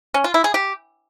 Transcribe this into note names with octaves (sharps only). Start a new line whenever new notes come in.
C#4
F4
E4
G#4
G4